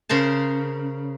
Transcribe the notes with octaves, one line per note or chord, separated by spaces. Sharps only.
C#3 A#4 C5 A5